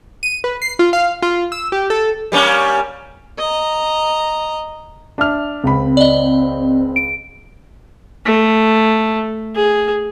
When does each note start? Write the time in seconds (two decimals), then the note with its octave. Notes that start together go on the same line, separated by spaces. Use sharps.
0.23 D#7
0.44 B4
0.62 C7
0.79 F4
0.93 F5
1.22 F4
1.52 E6
1.72 G4
1.90 A4
2.32 G3 A#3 C#4
3.38 D#5 A#5
5.18 D4 E5 F6
5.64 C#2 C4 B5
5.97 D5 D#5
6.96 D7
8.25 A3
9.56 G#4